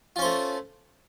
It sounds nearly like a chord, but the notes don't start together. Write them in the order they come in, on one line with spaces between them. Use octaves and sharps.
F4 C#4 C5 A3